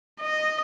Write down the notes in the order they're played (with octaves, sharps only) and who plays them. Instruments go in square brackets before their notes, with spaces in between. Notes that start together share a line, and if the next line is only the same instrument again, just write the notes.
[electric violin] D#5